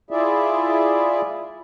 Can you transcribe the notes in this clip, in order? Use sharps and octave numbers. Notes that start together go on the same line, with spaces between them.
E4 F4 G#4 D5 E5